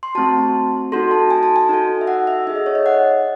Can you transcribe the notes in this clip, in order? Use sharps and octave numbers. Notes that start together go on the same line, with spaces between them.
C6
A3 C4 F#4 A5
D#4 F#4 A4 C6
A5
G#5
A5
G#5
D#4 F#4 A4
E5
F#5
E5
D#4 G#4 E5
D#5
C#5
D#5
F#5